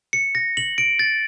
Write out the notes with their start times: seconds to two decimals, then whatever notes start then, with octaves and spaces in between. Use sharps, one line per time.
0.13 C#7
0.35 A#6
0.57 F#7
0.78 D7
0.99 A6